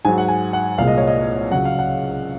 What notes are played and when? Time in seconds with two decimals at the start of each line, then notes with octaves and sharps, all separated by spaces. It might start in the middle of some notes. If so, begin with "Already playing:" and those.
0.05 G#2 F#3 G#5
0.18 F#5
0.28 G#5
0.53 F#5
0.78 C2 A#2 G#3 F5
0.88 D#5
0.98 C#5
1.08 D#5
1.51 C#2 C#3 F#3 F#5
1.65 F5
1.79 F#5